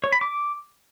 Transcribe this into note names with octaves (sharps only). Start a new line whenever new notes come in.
C#5
B5
D6